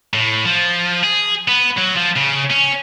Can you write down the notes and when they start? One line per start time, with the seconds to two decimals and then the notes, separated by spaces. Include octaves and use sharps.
0.14 A2
0.45 F3
1.03 G#4
1.48 B3
1.78 F#3
1.97 F3
2.17 C#3
2.51 C#4